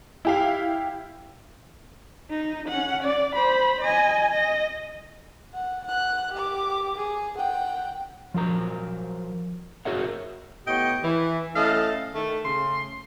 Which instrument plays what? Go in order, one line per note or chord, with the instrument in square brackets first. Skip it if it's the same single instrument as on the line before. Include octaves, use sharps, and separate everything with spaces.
[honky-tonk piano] E4 G4 F5
[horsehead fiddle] D#4
C#4 F#5
D5
C5 B5
D#5 G#5
D#5
[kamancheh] F#5
F#5 F#6
G4 D6
G#4
F#5 G5
[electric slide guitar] F3 F#3 A#4 A#5
F#4 G#4 A#4 C#5 E5 F#5
[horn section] A2 B3 G4 C#5 D#5 G5
E3
A3 C#4 E4 A4 D#5 F5
D#3 A3
C#3 A3 C6